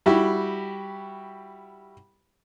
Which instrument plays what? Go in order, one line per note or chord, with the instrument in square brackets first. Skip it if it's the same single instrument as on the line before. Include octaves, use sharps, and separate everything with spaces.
[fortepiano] G3 E4 F#4 G4